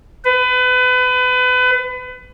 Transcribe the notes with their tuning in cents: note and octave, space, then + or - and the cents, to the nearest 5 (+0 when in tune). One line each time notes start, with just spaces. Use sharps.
B4 +30